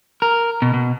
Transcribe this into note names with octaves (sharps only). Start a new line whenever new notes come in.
A#4
B2
B2